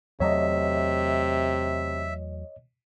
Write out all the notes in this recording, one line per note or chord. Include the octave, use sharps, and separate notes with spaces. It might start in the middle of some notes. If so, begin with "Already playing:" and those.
E2 C3 F#3 A3 C#5 D#5 E5